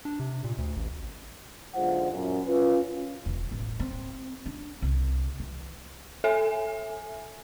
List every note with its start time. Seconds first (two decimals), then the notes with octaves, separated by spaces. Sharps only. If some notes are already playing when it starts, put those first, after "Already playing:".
0.05 D4
0.20 C3
0.44 A#2
0.58 D2
0.77 A1
1.74 B1 D3 G#3 F4 C5 F#5
2.11 F#2 A#2
2.46 C#4 F4 B4
3.26 E1
3.52 A1
3.80 C4
4.46 D4
4.82 C2
5.40 E3
6.24 A4 E5 G#5